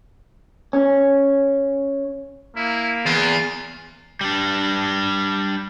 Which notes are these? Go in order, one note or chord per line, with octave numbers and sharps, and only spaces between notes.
C#4
A#3 E4
E2 F4
G3 D4